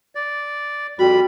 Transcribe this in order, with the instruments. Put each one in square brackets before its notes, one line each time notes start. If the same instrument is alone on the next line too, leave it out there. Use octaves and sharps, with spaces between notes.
[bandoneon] D5
[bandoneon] F2 G3 B5 [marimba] F#4